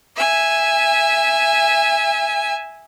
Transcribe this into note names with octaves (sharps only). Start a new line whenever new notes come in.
E5 G#5